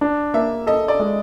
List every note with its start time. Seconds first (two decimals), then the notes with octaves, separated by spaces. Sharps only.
0.01 D4
0.34 A#3 E5
0.67 A4 D#5
0.88 D5
0.99 G#3